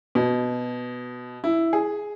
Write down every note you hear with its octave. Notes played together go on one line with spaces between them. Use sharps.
B2
E4
G#4